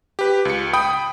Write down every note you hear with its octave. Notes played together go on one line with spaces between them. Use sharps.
G4 B4
C#2 C#7
G5 B5 D#6